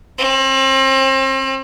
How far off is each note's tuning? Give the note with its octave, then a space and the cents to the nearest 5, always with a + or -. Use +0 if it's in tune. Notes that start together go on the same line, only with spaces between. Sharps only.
C4 +35